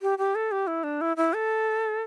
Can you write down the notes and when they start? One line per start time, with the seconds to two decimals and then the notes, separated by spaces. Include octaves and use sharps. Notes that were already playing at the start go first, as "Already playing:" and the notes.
0.02 G4
0.18 G4
0.35 A4
0.52 G4
0.67 E4
0.84 D4
1.01 E4
1.17 E4
1.33 A4